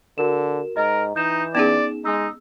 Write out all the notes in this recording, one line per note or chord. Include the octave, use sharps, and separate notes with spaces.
D3 F#4 A#4 E7
G#2 A#4 D#5 A#5
E3 D#4 G6 E7
B3 C#4 D#4 G#4 D5 E7
G#3 D#4 E6